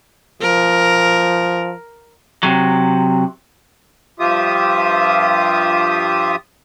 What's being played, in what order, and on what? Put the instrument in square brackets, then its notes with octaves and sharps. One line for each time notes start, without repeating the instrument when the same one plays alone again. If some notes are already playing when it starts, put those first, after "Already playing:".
[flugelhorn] F3 [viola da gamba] A#4
[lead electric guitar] C3 F#3
[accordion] G2 F3 F4 G4 E5 D#6